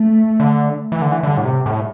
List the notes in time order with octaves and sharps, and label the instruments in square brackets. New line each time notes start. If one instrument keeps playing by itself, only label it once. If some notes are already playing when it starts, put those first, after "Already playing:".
Already playing: [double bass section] A3
[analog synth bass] D3
E3
D3
E3
[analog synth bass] D3 [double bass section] G3
[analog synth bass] A2
C3
A2